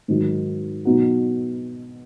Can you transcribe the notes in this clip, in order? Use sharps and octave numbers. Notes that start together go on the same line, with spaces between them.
G#2 D#3 F#3
B2 F#3 B3 D#4 F#4